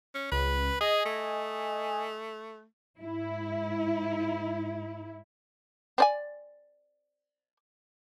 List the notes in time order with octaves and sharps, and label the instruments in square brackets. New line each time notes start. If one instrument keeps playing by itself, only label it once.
[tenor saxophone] C#4
[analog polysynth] C#2 [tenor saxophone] B4
[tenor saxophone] G#4 [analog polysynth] D#5 G#5
[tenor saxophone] A3
[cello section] G#2 E4
[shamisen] C4 D5 G#5